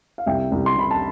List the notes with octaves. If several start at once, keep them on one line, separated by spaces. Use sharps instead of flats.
F5
C2 E5 G5
C2
C6
C3 B5
A5